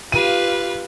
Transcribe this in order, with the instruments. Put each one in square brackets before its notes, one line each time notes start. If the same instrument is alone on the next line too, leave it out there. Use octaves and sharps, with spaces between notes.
[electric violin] F4 G4 [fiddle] B4 F5 [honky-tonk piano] D#7